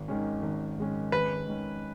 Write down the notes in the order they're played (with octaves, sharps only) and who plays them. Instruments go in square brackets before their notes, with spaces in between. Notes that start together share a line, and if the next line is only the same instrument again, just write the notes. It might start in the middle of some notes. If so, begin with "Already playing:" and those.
Already playing: [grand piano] G#1
G#2 D#3 G#3 C#4
G#1
G#2 D#3 G#3 C#4
[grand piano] G#1 [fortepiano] B4
[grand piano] G#2 D#3 G#3 C#4